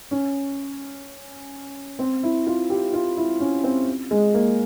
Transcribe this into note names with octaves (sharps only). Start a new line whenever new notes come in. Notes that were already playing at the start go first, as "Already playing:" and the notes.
C#4
C4
E4
F4
G4
F4
E4
C#4
C4
G#3
A#3